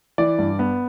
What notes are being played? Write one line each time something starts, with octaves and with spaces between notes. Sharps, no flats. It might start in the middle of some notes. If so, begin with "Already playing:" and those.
E3 D5
G2
B3